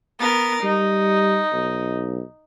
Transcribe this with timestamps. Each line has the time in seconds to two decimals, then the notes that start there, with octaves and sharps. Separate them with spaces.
0.20 B3 A#4 A6
0.63 G3 D#4
1.53 B1